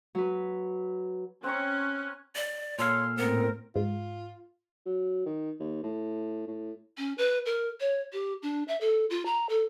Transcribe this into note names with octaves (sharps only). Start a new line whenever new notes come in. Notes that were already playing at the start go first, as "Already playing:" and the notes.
F#3 B4
C4 C#4 A#5 C#6 F#6
D5
A#2 A4 C#5 F5 C6
A2 B3 C4 A#4
G#2 F4
F#3
D#3
D#2
A2
A2
C#4
B4
A#4
C#5
G4
D4
E5
A4
F4
A#5
A4